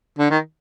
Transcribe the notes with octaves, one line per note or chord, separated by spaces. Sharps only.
D3
D#3